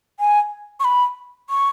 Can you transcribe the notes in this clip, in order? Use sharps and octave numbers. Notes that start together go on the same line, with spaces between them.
G#5
C#6
B5
C#6